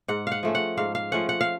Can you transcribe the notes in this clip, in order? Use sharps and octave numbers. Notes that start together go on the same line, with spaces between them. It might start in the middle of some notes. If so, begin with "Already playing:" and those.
G#2 F#5
F5 F#5
F3 A3 C#4
F#5
G#2 F5
F5
F3 A3 C#4 F#5
F#5
F5